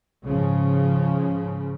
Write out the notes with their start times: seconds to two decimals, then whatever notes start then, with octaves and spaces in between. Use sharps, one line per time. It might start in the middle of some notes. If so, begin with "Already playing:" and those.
0.23 G#2 C#3 F3